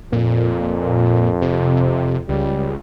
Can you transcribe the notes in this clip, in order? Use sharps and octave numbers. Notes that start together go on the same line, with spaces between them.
F2 A#2
C3
C#2 G3